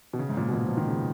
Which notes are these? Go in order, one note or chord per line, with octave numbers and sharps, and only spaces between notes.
B2
C#3
G#2
A#2
B2
A#2
F3
D#3
C#3